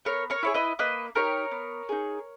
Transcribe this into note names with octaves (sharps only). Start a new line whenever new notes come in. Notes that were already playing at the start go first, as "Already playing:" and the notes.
B3 A#4 C#5
A#4 C#5
E4 G#4 C#5
B4 D#5
A#3 B4 D#5
D#4 G4 A#4 C#5
B3
D#4 G#4